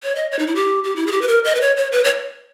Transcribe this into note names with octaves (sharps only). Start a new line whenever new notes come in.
C#5
D#5
C#5
D#4
E4
G4
G4
E4
G#4
G4
B4
A#4
D#5
B4
C#5
C#5
B4
C#5